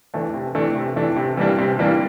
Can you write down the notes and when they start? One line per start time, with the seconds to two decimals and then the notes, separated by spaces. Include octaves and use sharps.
0.14 E3 A3 D4
0.34 C3
0.55 E3 A3 D4
0.76 C3
0.96 E3 A3 D4
1.17 C3
1.37 E3 G3 A#3 D4
1.58 C3
1.79 E3 G3 A#3 D4